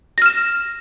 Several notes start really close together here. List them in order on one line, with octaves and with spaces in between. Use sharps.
A#6 F6 E7